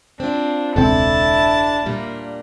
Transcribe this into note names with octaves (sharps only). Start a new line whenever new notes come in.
C4 D4 F4
E1 C#2 C4 D4 E4 A4 A5
A#2 G3 A#3 D4